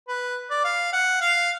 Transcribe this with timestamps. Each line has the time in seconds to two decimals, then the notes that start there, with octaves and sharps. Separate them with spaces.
0.08 B4
0.50 D5
0.64 F5
0.93 F#5
1.21 F5